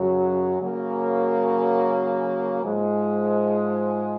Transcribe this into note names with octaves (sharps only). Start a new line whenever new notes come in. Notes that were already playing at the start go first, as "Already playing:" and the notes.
Already playing: F#2 C#3 F#3
C#3 F#3 A#3
G#2 F3 G#3